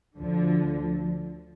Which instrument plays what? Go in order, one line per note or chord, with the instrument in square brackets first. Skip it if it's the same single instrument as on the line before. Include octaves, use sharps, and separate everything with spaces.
[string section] D2 D3 F3